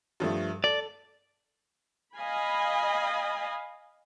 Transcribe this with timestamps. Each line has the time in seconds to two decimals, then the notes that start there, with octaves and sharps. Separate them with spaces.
0.20 G2 F3 A3
0.64 A4 D5
2.16 D#5 F5 G#5 B5